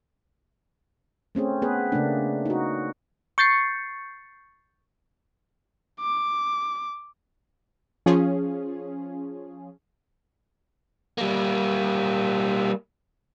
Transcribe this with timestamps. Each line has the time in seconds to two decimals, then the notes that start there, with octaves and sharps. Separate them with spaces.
1.35 A3 C4 C#4 G#4
1.62 B3 G#4 B4
1.92 C#3 A3 A#3 D4
2.46 D#4 F#4
3.38 C#6 G6 A6 C7 C#7
6.00 D6
8.06 F3 C#4 F4 G#4
11.18 G3 A#3